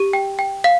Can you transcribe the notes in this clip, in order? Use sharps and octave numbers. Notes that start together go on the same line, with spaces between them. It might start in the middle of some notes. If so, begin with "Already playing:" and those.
Already playing: G4
G5
G5
F5